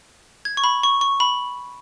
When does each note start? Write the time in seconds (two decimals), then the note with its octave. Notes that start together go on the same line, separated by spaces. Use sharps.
0.45 G#6
0.57 C#6
0.64 B5
0.83 C#6
1.01 C#6
1.20 B5